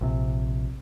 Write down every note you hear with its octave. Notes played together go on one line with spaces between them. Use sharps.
A#1 C3